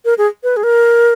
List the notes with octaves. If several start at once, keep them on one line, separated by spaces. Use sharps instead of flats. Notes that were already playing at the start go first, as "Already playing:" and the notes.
A#4
G#4
B4
G#4
A#4